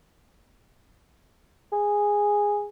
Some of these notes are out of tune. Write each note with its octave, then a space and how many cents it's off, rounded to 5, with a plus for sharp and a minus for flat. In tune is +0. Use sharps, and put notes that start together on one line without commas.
G#4 -10